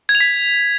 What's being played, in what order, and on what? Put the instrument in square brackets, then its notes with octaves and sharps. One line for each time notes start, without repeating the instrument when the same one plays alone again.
[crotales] G#6
F7
B6